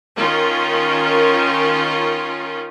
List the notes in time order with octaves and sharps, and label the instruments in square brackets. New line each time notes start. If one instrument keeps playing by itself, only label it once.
[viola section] D#3 C#4 F4 A#4